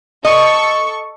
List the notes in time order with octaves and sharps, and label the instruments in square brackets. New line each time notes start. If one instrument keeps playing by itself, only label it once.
[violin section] A4 C#6 [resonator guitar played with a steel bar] D#5